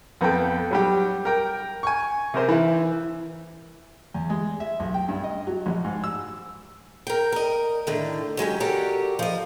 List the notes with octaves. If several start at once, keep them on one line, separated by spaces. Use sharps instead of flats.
F2 B3 A4 G5
F#3 G3 G4
A#4 G5
G#5 C#6
C3 A#4 C5
E3 E4
E2
G#3
E5
B1
G5
G2
D#5
F#3
A#1
G#2
E6
A#4 G5
A#4 D#5
A2 D3 D#3
F#3 G#3 C#4 G4
F#4 G4 A4 A#4 C#5 D5
F3 D#5